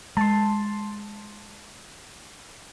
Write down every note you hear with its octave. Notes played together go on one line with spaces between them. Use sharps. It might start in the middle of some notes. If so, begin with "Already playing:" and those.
G#3 A5 C6